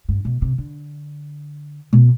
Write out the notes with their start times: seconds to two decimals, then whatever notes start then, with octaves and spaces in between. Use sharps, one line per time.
0.09 G2
0.25 B2
0.42 C3
0.58 D3
1.93 B2